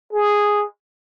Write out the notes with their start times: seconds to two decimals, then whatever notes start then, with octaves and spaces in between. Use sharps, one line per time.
0.13 G#4